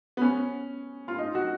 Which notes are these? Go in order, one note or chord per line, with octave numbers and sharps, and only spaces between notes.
B3
C#4
F4
D#4
F#4